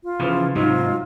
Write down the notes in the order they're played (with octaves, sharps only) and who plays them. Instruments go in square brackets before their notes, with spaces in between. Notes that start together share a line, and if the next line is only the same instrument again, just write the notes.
[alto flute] F4
[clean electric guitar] C#3 E3 F3 [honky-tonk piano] B4 F6 A6
[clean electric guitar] G#2 C3 F#3 [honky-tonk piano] D#4 [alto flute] F4